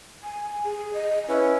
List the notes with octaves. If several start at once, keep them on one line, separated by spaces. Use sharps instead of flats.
G#5
G#4
D#5
C#4 E4 B4